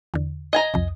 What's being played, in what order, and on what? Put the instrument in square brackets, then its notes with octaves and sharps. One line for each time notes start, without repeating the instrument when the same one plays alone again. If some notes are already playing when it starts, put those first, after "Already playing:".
[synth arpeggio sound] E2 D3
[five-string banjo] D#5 G#5 A#5
[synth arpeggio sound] C2 F2